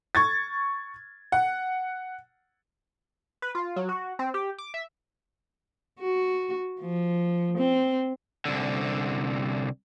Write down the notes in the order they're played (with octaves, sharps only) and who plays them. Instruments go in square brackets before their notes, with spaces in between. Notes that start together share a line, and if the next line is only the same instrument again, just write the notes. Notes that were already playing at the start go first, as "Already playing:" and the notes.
[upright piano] C#6 G#6 A6
F#5
[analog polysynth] B4
F4
F#3
F#4
C4
G4
D6
E5
[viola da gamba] F#4
F3
C4
[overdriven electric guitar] C2 D3